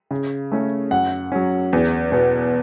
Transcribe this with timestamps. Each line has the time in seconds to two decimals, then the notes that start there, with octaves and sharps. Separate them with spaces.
0.11 C#3
0.52 A3 C#4
0.91 F#2 F#5
1.32 F#3 C#4
1.73 E2
2.12 B2 B3